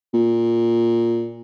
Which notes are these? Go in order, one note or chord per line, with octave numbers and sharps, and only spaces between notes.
A#2